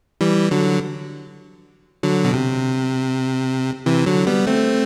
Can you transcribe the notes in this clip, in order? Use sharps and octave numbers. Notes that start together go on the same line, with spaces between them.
E3 G3
D3 F#3
D3 F#3
B2
C3
C3 E3
D3 F#3
G3 B3
A3 C4